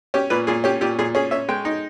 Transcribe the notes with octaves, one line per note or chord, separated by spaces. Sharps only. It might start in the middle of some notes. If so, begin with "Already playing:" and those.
C#4 G4
A#2 B4
A#2 G#4
C#4 G4
A#2 G4
A#2 G#4
C#4 G#4
C#4 E5
G#3 G5
D#4